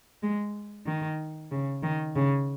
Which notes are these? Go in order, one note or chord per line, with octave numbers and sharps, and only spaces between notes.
G#3
D#3
C#3
D#3
C#3